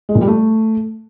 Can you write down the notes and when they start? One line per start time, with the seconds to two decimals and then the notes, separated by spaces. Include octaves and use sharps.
0.09 G#3
0.15 A#2
0.21 G3
0.28 A3